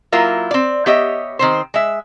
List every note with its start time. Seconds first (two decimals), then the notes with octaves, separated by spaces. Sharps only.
0.12 F#3 A#3 E4 F4 A#4
0.51 C4 D5
0.86 B3 G4 C#5 D#5 E5
1.39 D#3 C4 C5
1.74 G#3 E5